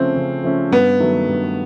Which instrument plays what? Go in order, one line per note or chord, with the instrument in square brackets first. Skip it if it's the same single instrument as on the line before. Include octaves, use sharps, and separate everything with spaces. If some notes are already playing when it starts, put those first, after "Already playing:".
Already playing: [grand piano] C#3 F3 A3 C#4 [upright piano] C4
[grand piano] C#3
F3 A3 C#4
[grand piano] G2 [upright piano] B3
[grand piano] D#3 F#3 A3
G2